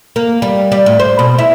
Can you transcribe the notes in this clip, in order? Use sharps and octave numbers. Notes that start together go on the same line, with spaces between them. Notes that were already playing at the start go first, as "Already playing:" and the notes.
A#3
G3
G3
A2
C5
B2
E4